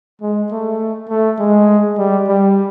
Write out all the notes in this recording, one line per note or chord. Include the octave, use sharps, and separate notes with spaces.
G#3
A3
A3
G#3
G3
G3